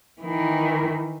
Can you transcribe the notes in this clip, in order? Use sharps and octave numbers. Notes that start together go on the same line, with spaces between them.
D#3 E3